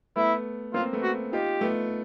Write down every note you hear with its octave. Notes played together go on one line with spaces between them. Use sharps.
A3 B3 E4
A#3 C4 F4
A3 B3
F#4
D#4 F4 G4
A3 B3